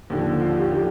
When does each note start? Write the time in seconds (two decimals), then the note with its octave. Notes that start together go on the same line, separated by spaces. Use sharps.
0.10 D#2 D3 F3
0.41 F4
0.56 G4
0.71 D3 F3 G4